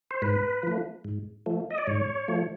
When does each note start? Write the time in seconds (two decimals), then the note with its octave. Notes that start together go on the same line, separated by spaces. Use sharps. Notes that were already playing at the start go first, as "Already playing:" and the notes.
0.11 C5
0.22 G#2 B4
0.63 F3 A3
1.05 G#2
1.46 F3 A3
1.71 D#5
1.78 D5
1.87 G#2 C#5
2.28 F3 A3